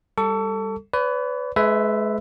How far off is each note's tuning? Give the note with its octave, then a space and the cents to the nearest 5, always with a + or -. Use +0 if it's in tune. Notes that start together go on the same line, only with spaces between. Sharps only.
G3 +15 A4 +15 C#6 +40
B4 +20 D5 -45
G#3 +35 B4 +20 E5 +0